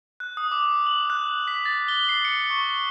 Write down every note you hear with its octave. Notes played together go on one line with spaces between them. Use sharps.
F#6
D#6
D6
F#7
F#6
B6
A6
G7
C7
C#7
C#6